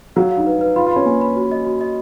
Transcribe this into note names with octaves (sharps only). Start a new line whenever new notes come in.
F#3 F5
F5
D#4
B4
B4
F4 B5
F4
C#4 B5
A#3 G#5
B5
F#4
D#5
F#4
D#5